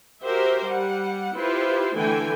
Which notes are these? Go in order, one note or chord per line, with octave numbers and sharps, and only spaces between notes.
F#4 G4 A#4 C5 E5
G3 F#5
E4 F4 G4 B4 C5
D3 E3 A3 G5 G#5